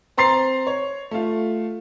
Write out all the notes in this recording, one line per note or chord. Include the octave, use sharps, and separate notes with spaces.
C4 A#5 C6 A6 C7
C#5
A3 F4